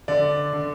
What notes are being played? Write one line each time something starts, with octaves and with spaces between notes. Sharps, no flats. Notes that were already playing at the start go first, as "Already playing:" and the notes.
D3 D5
D3